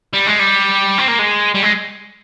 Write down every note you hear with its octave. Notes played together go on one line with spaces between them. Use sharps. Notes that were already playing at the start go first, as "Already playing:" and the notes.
G3
G#3
G3
C4
A#3
G#3
G3
G#3